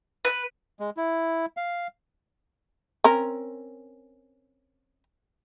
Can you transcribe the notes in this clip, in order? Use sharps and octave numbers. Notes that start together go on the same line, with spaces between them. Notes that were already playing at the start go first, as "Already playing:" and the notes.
B4
G#3
E4
F5
C4 C#4 A#4